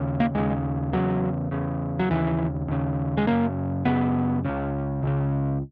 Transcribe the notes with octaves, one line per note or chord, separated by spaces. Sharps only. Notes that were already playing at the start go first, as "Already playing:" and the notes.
Already playing: D#2 C#3
A#3
D#2 C#3 G#3
E2 C#3 F#3
E2 C#3
F#3
D#2 C#3 E3
D#2 C#3
G#3
F#2 C#3 A#3
F#2 C#3 B3
C#2 C#3
C#2 C#3